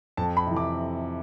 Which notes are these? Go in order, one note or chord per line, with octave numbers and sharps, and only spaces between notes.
F2 A5
B5
C3 E3
D6